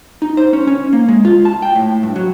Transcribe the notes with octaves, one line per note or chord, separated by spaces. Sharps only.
D#4
C5
C#4
C#4
A#3
G#3
F4
A5
G5
A2
G2
F#3